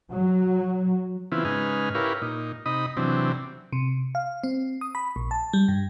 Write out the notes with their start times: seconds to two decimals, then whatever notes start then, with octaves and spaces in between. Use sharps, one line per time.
0.11 F#3
1.32 C#3 E3 B3 C4 E4 F4
1.45 G#2 C#3 D#4 B4 G#5 F6
1.95 E4 G4 A#4 B4 C#5 F5
2.22 A#2 D#4
2.66 C3 D#4 D#5 B5 D#6
2.97 C3 E3 F#3 C4 D4
3.73 C3
4.15 F5
4.44 C4
4.81 D#6
4.95 B5
5.16 A#1
5.31 A5
5.53 G3
5.68 G2